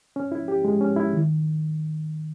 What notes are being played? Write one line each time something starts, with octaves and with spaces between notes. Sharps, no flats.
C#4
E4
G4
G#3
C#4
E4
D#3